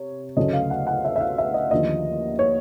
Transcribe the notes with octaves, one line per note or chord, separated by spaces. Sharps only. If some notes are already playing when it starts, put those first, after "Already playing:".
Already playing: C3 C#5
D2 C#3 F#3 A3 C#4 D#5
F5
F#5
F#5
E5
E5
F5
E5
D#5
D#2 D3 F3 D#5
C#5